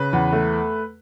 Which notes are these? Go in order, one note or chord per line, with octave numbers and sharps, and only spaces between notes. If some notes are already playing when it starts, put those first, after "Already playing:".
Already playing: C#3 B4
E2
A3